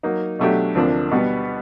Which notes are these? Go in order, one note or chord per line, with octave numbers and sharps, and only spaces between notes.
F#3 A#3 D#4
B2 F#3 A3 D4 G4
D2 C3 F3 A#3 D4
B2 G3 B3